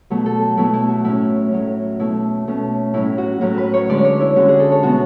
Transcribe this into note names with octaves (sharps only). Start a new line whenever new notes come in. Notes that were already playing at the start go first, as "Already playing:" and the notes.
B2 F#3 A3
A4
B2 F#3 A3 E4
E4
F#4
A2 F#3 C#4 E4
A2 F#3 C#4
B2 A3 C#4 E4
B2 A3 C#4
A2 F#3 C#4 E4
F#4
A2 F#3 C#4 F#4
B4
C#5
D3 G#3 C#4 D5
C#5
E4
D3 G#3 C#4 F#4
G#4
A4
C#5
B2 G#3 B3 F#4